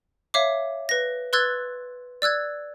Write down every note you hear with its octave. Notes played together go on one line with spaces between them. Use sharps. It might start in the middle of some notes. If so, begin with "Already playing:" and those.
C#5 E5 F5 D6
B4 A#6
B4 C6 E6 F#6 G#6 A6
D5 E6 F#6 G#6